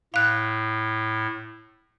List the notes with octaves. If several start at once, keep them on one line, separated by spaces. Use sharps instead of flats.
A2 F5 F#6